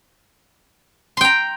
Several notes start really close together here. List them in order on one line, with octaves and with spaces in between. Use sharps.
C6 G5 A#5